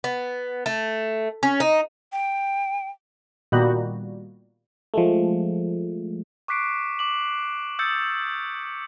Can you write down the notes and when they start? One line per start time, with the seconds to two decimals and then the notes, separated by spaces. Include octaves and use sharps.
0.04 B3
0.66 A3
1.43 C#4
1.60 D#4
2.12 G5
3.52 A#2 D#3 G3 A#3 B3 F#4
4.94 F3 G#3 A3
6.48 C#6 D6 F#6 B6 C7 D7
6.99 D6 F#7
7.79 D#6 E6 G6 A6 C#7